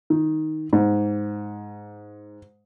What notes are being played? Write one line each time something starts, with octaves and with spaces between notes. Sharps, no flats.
D#3
G#2